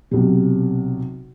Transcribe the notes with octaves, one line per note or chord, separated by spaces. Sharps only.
B1 C3